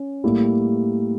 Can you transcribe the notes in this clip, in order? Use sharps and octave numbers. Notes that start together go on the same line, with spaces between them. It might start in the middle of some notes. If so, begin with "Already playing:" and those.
Already playing: C#4
A2 G3 A#3 E4 G4